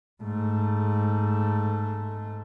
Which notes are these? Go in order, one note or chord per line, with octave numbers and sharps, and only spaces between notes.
G#2 A3